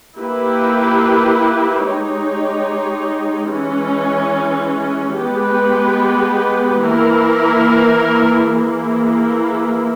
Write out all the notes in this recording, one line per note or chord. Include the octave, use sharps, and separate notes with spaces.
A#3 E4 G4 B4
G#3 D#4 G4 C#5
E3 G#3 C#4
G#3 B3 G4 B4
E3 A#3 E4 A#4
E3 A#3 E4 G#4